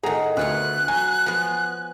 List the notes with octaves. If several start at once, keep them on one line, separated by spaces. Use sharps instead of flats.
A2 D#3 G#4 F#5 A#5
D2 B3 F4 C#5 F#6
F#3 G#5
F3 B3